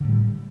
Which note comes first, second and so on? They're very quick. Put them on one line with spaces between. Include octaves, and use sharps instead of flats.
D3 A2 G3